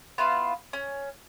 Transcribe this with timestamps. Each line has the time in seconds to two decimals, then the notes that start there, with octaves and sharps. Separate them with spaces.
0.18 B3 E4 F4 F5
0.73 C#4